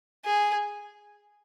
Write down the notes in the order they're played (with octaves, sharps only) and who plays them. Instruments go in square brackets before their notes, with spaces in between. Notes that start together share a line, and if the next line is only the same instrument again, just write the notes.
[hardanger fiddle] G#4